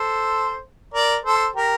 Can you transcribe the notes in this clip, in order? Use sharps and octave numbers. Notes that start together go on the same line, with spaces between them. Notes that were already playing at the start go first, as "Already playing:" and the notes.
Already playing: A4 C5
A#4 D5
A4 C5
G4 A#4